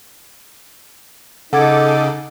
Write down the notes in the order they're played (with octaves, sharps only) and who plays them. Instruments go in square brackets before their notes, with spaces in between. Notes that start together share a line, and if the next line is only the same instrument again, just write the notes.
[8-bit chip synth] C#3 [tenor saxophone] D#4 [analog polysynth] A4 D6 [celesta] F#5 G#6